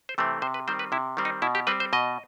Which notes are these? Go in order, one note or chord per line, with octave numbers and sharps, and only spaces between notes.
C5
C3 E3 A3 C4
C3 C5
B4
D#3 G3 C4 C5
B4
C3 E4
D#3 G3 C4
D#4
B2 E4
G4
G3 C4 B4
C5
B2 D#5